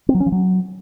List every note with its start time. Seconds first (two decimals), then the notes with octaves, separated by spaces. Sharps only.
0.09 C4
0.15 F#3
0.20 C#4
0.26 F3
0.32 F#3